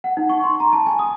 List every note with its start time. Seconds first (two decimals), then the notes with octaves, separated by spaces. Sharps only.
0.04 F#5
0.17 D#4
0.29 C#6
0.44 C6
0.60 A#5
0.73 A5
0.86 G#5
0.99 D#6